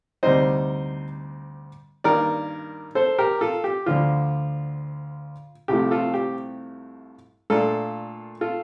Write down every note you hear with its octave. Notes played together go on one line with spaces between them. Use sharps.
D2 C3 G3 C4 D#4 C5 D#5
G2 D#3 A#3 D#4 A#4 D5
A4 C5
G4 A#4
F4 A4
G4
D2 D3 F3 F4
C2 C3 F3 A3 G4
F4 A4
G4
A#2 A3 D4 F4 A4
F4 A4